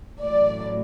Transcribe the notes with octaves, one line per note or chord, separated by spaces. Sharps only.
A1 A2 F#3 D5